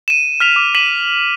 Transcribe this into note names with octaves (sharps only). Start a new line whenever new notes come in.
D#7 E7
F6 B6 F7
D6
B6 D#7 E7 F#7